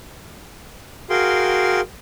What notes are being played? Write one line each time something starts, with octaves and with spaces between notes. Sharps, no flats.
F#4 G#4 A#4 F5 G5 C6